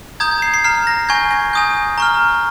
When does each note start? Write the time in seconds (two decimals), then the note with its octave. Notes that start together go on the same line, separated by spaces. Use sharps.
0.20 A#5 D#6 G6 G#6
0.31 G#6
0.42 C7
0.54 C7
0.64 A#5 F6 C7
0.87 A#6
1.09 G#5 C#6 G6 G#6
1.31 A#6
1.53 G#5 D#6 G6
1.98 A#5 C#6 F6